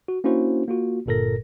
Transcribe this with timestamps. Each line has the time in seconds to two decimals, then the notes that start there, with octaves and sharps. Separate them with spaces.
0.08 F#4
0.24 A#3 C#4 D4 E4 F#4 C5
0.68 A#3 F4 F#4
1.06 G1 G2 A#2 A4 A#4 A#6